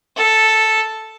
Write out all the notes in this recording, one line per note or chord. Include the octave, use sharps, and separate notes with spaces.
A4